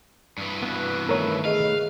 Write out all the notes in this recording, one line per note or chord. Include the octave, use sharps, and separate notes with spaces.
G2 E3
B3 F#4
D#3 A3 A#4 B4 C#5
G#4 D#5 F5